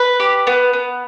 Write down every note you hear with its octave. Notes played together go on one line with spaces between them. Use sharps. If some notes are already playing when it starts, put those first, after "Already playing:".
Already playing: B4
G4
B3
B3